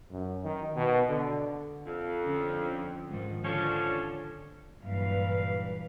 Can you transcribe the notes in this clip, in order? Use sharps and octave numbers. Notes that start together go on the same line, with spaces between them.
F#2
D#3
B2
D3
F2
D3 F3 C#4
G#2 D#3 F3
D3 F3 C#4 D4 A4
G2 A#2 E3 F#3 B4 F5